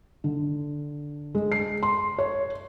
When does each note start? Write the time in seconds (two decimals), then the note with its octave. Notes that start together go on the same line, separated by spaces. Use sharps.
0.24 D3
1.35 G#3
1.52 C7
1.83 C6
2.19 C#5